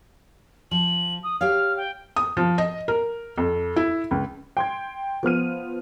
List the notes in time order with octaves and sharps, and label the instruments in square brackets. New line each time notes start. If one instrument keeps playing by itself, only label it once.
[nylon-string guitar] F3 [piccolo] F#7
[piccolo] D#6
[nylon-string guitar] G4 C#5 F5 [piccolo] F6
[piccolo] G5
[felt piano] D#6
F3
D#5
A#4
F2
E4
C#2
[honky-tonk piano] G5 C6 G#6
F3 B3 F6 D#7